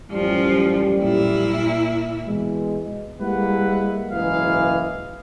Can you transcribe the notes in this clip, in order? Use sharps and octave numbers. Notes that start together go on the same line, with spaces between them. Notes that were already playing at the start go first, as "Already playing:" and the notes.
A1 F#2 F3 G3 C#4
A#2 E4
B2 E3 G#3
G3 G#3 A#3 E4 B4 F#5
F#1 G#2 E3 D#4 G#4 F5